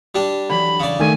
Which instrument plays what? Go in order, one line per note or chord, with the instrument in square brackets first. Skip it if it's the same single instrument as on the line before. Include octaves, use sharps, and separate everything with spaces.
[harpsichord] G3 D4
[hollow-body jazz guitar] D3 E3 F#3 [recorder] B5
[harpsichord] C#3 D5
[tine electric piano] D#3 A3 [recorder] G#5